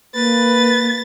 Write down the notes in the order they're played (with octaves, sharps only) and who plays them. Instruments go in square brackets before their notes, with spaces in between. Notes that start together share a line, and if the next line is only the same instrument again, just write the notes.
[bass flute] A#3 [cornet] B4 [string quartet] A6